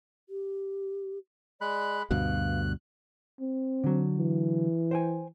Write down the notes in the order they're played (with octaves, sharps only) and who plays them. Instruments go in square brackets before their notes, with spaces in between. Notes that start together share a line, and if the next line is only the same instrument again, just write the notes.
[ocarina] G4
[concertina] G#3 B5 F#6 [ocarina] D5
[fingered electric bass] D2 G2 B2 [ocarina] F5 [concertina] F#6
[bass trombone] C4
[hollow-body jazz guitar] D3 F#3
[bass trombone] E3
[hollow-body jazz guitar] C5 G5 G#5